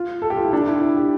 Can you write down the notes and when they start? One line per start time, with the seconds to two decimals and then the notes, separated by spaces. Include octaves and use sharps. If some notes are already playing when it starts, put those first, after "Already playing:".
Already playing: F4
0.22 A4
0.30 G4
0.37 F4
0.45 E4
0.53 D4
0.67 E4
0.82 E4
0.96 G4